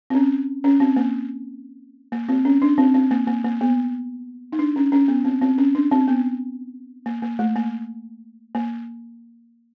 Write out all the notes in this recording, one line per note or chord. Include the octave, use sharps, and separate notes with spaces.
C4
C#4
C#4
C4
A#3
A#3
C4
C#4
D4
C4
C4
A#3
A#3
A#3
B3
D#4
D4
C#4
C#4
B3
C4
C4
C#4
D4
C4
B3
A#3
A#3
A3
A#3
A#3